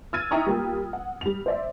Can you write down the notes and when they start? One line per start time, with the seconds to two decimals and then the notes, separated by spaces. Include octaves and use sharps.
0.13 E6 F6 G#6 A6 D#7
0.31 D#4 E4 G5 A#5 C#6 D#6
0.46 G3 A#3 F4 G5
0.93 F#5
1.21 G3 F7
1.46 C5 D5 E5